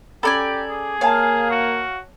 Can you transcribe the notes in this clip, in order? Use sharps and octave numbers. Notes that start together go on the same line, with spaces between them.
C#4 G4 A4 D5 G#5 A#5 B5
G#4
A#3 C#5 F5 G#5 A5
F#4